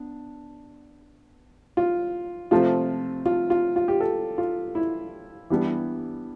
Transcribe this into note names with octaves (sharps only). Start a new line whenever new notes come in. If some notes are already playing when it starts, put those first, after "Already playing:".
Already playing: B3 D4
F4
C3 F3 A3 C4 F4
F4
F4
F4
G4
A4
F4
E4
E3 G3 B3 D4